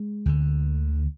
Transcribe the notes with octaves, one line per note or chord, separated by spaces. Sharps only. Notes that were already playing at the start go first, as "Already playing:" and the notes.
Already playing: G#3
D2 D3